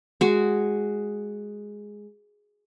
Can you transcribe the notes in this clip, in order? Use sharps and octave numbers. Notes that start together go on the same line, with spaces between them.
G#3 F#4